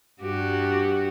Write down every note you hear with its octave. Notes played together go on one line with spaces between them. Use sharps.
G2 F#4 G4